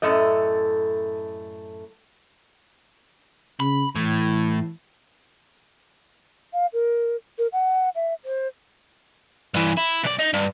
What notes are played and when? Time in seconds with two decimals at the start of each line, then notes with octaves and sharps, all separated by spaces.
0.02 F#2 A2 A3 D#5
3.60 C#3 B5
3.96 A2 E3
6.53 F5
6.73 A#4
7.39 A#4
7.53 F#5
7.95 E5
8.25 C5
9.54 G2 E3
9.77 E4
10.04 B1 D5
10.19 D#4
10.33 G2